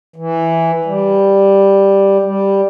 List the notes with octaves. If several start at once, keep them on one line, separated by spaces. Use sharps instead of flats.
E3
G3
G3